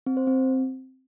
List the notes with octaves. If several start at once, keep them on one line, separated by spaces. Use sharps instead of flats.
C4
C5
C4